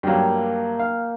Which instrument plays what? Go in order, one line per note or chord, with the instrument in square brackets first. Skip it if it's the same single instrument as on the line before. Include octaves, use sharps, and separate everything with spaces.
[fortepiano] G2 F#3 [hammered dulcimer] A#3 E5 G5
[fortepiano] F5